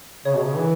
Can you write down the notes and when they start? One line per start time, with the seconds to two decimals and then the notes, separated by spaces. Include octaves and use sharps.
0.25 C#3 C#5
0.35 B2
0.46 C#3
0.57 E3